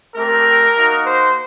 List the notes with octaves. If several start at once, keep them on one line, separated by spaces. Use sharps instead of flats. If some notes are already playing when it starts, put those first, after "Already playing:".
A3 C4 G4 A#4
A#3 D#4 F#4
C5